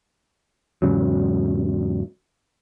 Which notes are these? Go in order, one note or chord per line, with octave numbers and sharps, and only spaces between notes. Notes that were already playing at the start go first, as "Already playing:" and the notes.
E2 G#2 C#3 F#3